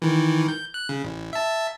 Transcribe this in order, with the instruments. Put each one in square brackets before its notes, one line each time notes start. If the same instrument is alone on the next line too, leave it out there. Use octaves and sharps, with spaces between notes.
[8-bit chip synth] D#3 E3
G6
F#6
C#3
A1
E5 A5